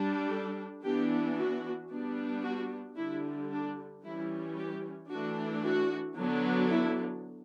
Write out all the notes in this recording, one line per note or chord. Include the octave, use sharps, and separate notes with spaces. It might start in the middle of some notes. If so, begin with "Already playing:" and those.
Already playing: G3 D4
A4
E3 B3 D4 G4
F#4
G3 B3 D4
F#4
D3 G3 D4 E4
D4
E3 G3 C#4 E4
G4
E3 A3 D4 F#4
F#4
D3 F#3 B3 D4
E4